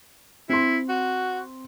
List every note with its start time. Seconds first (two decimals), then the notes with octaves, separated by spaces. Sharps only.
0.49 C4 E4 C6
0.89 F#4